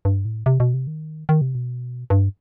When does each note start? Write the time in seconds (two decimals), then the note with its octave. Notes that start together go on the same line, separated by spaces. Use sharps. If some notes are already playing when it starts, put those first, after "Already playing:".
0.05 G2
0.25 A2
0.46 C3
0.60 B2
0.74 C3
0.87 D#3
1.29 D#3
1.41 C3
1.55 B2
2.10 G2